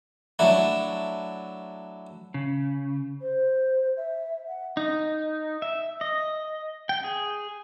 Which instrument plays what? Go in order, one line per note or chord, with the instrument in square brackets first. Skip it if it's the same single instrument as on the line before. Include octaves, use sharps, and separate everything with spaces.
[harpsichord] F#3 A3 D4 E4
[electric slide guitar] C#3
[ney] C5
E5
F#5
[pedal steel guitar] D#4
E5
D#5
G5
G#4